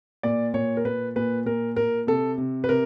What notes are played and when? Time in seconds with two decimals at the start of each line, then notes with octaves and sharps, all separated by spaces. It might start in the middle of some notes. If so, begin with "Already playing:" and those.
0.23 A#2 D5
0.54 A#2 C#5
0.77 A#4
0.85 A#2 B4
1.16 A#2 B4
1.46 A#2 A#4
1.76 A#2 A#4
2.07 C3 A4
2.38 C3
2.64 B4
2.69 C3 A#4